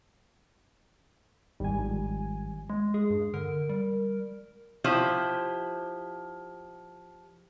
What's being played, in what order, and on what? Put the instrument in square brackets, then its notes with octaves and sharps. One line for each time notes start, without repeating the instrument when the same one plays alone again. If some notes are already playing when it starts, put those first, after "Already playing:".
[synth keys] G#1 G#5 [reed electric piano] A2 D#3 G3
[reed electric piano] D#3 F3 G3
[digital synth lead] G#3
[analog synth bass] G#3 [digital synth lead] G#4
[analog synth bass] G2
[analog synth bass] D3 [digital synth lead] A#4
[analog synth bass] G3
[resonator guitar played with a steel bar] F3 E4 G4 C5